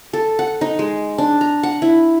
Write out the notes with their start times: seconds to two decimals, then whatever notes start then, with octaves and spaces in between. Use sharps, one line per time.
0.13 A4
0.39 F#5
0.61 D#4
0.79 G#3
1.18 D4
1.41 A#5
1.63 F#5
1.82 E4